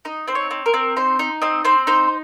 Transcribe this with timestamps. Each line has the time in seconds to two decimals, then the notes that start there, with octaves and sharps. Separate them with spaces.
0.05 D#4 D#5
0.28 C4 C5
0.35 C#5
0.51 C4
0.66 A#4
0.74 C4
0.97 D#4 C5
1.19 D#4
1.42 C4 D#5
1.65 C4 C5
1.87 D#4 C5